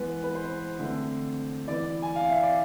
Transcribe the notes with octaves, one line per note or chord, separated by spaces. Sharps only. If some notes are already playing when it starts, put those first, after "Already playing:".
Already playing: E3 G#3 B3 B4
B4
C5
D3 A3 C4
E3 B3 D5
G#5
F5
E5
D5